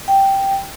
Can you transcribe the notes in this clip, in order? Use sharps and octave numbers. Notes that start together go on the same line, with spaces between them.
G5